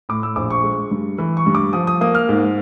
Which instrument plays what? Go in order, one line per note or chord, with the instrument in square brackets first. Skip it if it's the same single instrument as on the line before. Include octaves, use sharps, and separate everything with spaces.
[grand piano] A2 D6
E6
A#1 D6
C#6
G#3
G2
E3
C#6
G2
D6
F3 D#6
D#6
A#3 D#6
F6
G#2